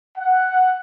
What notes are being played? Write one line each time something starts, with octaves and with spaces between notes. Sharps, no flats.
F#5